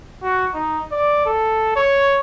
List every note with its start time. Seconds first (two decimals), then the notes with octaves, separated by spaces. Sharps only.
0.23 F#4
0.54 D#4
0.92 D5
1.26 A4
1.76 C#5